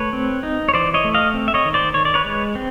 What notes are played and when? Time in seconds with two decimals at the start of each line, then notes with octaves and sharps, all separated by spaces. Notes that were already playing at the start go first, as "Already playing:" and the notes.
Already playing: A3 B4 C#5
0.13 C4
0.43 D#4
0.69 C#5
0.74 E3 C5 D5
0.94 C#5 D#5
1.04 A3
1.14 D#5 F5
1.34 C4
1.48 E5
1.54 C#5 D#5
1.65 D#3
1.74 C5 D5
1.94 D#3 C#5
2.05 D5
2.14 B4 C#5
2.24 G#3
2.55 C4